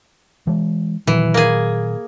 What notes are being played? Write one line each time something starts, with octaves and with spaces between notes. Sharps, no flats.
E3 G#3
A#2 D#3 E3 F#3
A#3 G#4